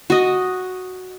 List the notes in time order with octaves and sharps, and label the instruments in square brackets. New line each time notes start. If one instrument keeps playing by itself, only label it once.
[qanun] F#4 D#5